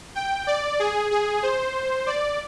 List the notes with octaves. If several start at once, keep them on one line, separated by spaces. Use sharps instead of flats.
G5
D5
G#4
G#4
C5
D5